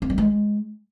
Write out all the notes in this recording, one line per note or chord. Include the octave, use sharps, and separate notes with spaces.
C4
G3
G#3